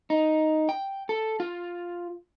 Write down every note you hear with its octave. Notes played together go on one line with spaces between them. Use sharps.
D#4
G5
A4
F4